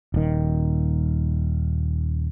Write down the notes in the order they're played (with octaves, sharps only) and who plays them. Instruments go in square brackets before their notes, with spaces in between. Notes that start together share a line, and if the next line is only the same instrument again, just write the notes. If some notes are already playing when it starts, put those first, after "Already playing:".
[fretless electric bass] D#1 D#3